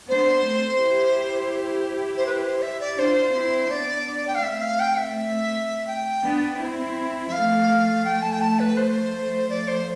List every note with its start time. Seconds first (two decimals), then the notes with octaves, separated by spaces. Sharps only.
0.09 B3 D4 C5
0.45 A3 C4
0.81 E4 G4
2.17 C5
2.26 B4
2.44 C5
2.62 E5
2.80 D5
2.98 D4 F4 C5
3.34 C4 E4
3.70 B3 D4 D5
4.27 G5
4.35 F5
4.43 A3 C4 E5
4.61 F5
4.79 G5
4.97 E5
5.87 G5
6.24 B3 D4
6.59 C4 E4
7.28 E5
7.32 F3 A3 F5
8.05 G5
8.22 A5
8.32 G5
8.41 A5
8.59 B4
8.77 C5
9.49 F3 A3 D5
9.68 C5